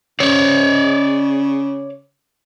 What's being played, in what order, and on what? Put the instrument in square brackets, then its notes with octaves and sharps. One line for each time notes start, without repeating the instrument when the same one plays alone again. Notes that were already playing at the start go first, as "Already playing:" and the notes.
[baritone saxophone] C#3 [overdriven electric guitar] C#5 D5